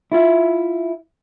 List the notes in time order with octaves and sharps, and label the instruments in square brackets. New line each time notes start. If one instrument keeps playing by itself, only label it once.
[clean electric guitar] E4 F4 E5 F5